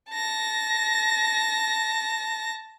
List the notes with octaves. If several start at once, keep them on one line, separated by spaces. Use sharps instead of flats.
A5 A#6